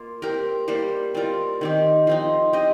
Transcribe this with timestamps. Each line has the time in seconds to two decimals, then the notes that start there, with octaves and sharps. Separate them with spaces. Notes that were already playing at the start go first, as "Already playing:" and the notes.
Already playing: A#3 F4
0.22 C4 G4 A#4
0.68 G3 A#3 G4 C5
1.14 G3 C4 F4 A#4
1.61 D#3 C4 G4
2.07 F3 C4 D#4
2.53 C4 G4 D#5